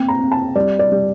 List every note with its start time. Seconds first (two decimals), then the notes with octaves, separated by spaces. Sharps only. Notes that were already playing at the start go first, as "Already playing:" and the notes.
Already playing: A#3 C4 G5
0.08 A#5
0.20 C4
0.32 A5
0.56 G3 D5
0.79 D5
0.92 G3